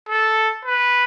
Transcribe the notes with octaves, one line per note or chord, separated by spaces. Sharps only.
A4
B4